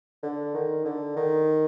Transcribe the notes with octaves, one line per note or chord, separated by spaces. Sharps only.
D3
D#3
D3
D#3